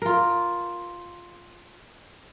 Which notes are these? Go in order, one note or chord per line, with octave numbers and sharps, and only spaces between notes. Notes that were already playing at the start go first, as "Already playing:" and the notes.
F4 A#4